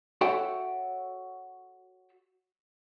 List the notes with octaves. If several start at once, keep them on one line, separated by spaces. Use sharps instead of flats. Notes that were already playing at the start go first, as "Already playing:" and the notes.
F#4 A4 C#5 E5 G5